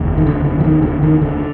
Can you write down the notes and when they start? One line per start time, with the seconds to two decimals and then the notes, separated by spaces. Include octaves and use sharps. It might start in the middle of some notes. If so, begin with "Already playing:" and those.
Already playing: F1 D#2
0.18 D#3
0.27 D3
0.45 D3
0.60 F3
0.64 D#3
0.83 D3
1.03 D#3
1.22 D3